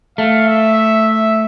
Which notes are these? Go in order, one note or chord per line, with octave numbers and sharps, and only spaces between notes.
A3 F5
E5